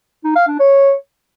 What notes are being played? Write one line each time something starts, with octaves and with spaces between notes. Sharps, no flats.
D#4
F5
D4
C#5